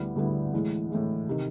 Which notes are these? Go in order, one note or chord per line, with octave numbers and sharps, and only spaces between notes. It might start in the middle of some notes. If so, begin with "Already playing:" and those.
Already playing: D2 D3 G3 B3 E4
D2 D3 G3 B3 E4
A2 E3 G#3
A2 E3 G#3
C3 D#3